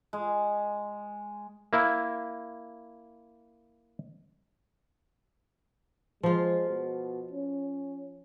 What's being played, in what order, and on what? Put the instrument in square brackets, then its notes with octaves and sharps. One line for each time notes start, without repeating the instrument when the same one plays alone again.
[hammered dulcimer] G#3
[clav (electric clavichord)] A#3 E4
[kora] F3 F4 [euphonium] G#3
[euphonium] B2
C#4